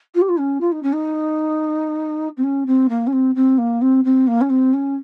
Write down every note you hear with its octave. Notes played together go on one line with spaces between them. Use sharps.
F4
G4
F4
C#4
F4
D#4
C#4
D#4
C4
C#4
C4
A#3
C#4
C4
C4
A#3
C4
C4
A#3
C#4
C4
C#4